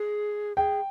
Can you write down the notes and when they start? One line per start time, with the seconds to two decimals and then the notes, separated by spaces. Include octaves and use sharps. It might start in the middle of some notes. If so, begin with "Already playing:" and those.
Already playing: G#4
0.57 G#4 G5